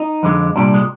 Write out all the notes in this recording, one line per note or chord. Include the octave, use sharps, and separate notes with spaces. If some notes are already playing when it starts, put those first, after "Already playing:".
Already playing: D#4
F2 D3 G#3
C2 A#2 G3 D4
G#3